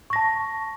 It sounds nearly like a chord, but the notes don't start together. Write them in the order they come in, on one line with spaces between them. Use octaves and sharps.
C#6 A#6 A5